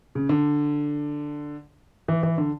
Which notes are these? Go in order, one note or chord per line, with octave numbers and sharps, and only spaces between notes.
C#3
D3
E3
E3
D3